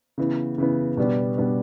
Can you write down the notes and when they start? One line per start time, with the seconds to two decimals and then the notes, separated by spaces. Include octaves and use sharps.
0.18 C#3 E3 B3
0.58 C#3 E3 B3
0.97 B2 G3 B3 D4
1.38 B2 G3 B3 D4